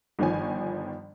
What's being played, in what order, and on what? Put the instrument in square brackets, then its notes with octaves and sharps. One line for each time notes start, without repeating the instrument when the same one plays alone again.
[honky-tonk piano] G1 D#3 F3 C#5 G#5